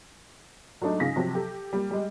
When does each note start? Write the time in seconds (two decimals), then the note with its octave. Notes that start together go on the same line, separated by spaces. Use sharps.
0.82 F#3 G#3 A3 D4 D#4
1.00 G#2 C#3 G#4 F5 A#6 B6
1.16 C3 F3 F#3
1.35 G4 A4
1.73 G3 A#3
1.91 G3 G#3